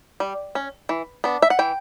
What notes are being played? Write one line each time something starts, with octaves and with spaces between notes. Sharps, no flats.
G3
C#4
E3
B3 D4
E5
F#5
E3 G5